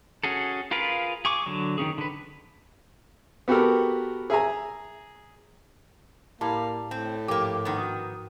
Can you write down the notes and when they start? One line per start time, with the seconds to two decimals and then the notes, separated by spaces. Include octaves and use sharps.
0.23 C#4 F#4 G#4 A4
0.71 F4 G#4 A#4 B4 F5
1.25 G#4 C#6 D6
1.46 D3 F#3
1.78 D#3 B3 C#4 G#4
1.98 D3 B4
3.48 B3 F#4 G4 A4 A#4
4.30 G#4 E5 G#5 A#5
6.41 A2 G3 A#3 E4 A5 B5 G#6
6.91 A2 C4 G5
7.28 G#2 F3 A#3 G4 A#4 D6
7.65 D#3 B3
7.78 F#4 D#6